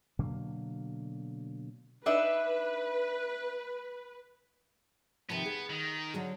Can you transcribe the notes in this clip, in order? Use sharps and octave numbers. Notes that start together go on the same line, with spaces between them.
B2 D3 F#3 A#3
D4 D#4 B4 E5
C3 D#3 F3 B3
G#4
D#3
D3 F#3 G#4